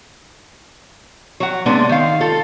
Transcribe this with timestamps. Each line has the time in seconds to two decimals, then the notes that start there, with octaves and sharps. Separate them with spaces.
1.40 F#3 F#5
1.66 C3 G#3 A#3 B3 D4
1.89 D#3 F5
2.21 F4 A4